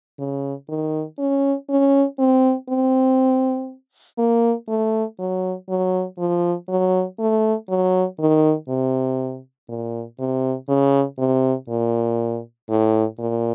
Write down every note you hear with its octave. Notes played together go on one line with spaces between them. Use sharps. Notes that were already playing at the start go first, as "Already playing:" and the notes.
C#3
D#3
C#4
C#4
C4
C4
A#3
A3
F#3
F#3
F3
F#3
A3
F#3
D#3
C3
A#2
C3
C#3
C3
A#2
A2
A#2